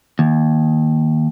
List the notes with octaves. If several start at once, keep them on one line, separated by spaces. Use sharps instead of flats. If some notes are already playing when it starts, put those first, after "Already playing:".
D#2